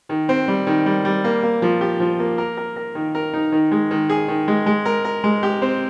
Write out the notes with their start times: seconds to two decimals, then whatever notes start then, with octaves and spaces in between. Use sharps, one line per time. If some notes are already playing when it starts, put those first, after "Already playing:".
0.09 D#3
0.29 C4
0.48 G3
0.67 D#3
0.86 G3
1.05 G3
1.24 A#3
1.43 A#3
1.62 F3
1.81 G4
2.00 F3
2.19 A#3
2.38 A#4
2.57 A#4
2.76 A#4
2.95 D#3
3.15 A#4
3.33 D#4
3.52 D#3
3.72 G#3
3.91 D#3
4.09 G#4
4.28 D#3
4.48 G#3
4.66 G#3
4.85 A#4
5.05 A#4
5.24 G#3
5.43 G4
5.62 C4